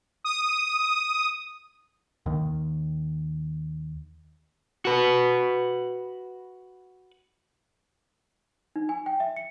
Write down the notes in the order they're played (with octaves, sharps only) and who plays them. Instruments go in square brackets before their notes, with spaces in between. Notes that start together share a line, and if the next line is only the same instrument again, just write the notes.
[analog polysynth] D#6
[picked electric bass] D#2 D#3
[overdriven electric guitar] F#4 B4
[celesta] D#4
G#5
G5
E5
C#7